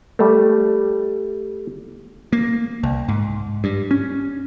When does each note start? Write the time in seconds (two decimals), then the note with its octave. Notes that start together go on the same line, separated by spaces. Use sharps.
0.19 G3 A3
2.33 A#3
2.83 C2
3.08 G#2
3.64 G2
3.91 C#4